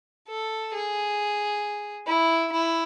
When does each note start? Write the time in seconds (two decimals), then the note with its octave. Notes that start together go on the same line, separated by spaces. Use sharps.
0.28 A4
0.73 G#4
2.06 E4
2.52 E4